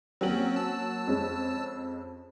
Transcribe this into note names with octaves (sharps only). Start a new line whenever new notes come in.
F#3 A#3 C4 C#4 F#7
A5 E6
F2 G#3 C#4